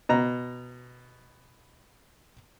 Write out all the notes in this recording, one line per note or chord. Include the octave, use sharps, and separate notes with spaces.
B2 A#5